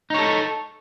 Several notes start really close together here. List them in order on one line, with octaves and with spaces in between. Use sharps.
D#4 C#5 A4